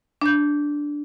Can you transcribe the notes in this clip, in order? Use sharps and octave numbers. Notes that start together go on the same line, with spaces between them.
D4 G6